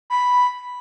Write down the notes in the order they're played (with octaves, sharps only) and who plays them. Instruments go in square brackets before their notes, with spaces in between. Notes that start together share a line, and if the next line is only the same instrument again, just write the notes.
[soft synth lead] B5